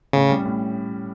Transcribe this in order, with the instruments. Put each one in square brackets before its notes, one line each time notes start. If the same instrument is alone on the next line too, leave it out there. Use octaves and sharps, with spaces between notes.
[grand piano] A2 [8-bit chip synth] C#3
[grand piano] G3 C#4
A2